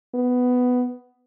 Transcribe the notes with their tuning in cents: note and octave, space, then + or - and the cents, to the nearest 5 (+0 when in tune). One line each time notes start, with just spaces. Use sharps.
B3 +10